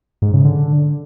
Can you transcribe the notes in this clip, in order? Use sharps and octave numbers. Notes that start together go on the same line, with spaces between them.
G#2
C#3
D3